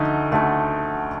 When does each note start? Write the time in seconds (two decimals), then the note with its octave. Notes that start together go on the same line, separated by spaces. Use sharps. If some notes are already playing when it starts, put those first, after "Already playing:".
Already playing: D2 D3 A3 D#4
0.32 D2 D3 A3